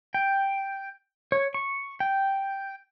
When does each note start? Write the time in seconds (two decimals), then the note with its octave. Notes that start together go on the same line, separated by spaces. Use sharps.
0.14 G5
1.32 C#5
1.54 C#6
2.00 G5